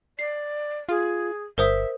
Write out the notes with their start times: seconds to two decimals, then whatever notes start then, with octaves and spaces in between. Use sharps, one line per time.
0.19 D5 C7
0.89 F4 G#4
1.58 G1 A#4 C5 E5 D#6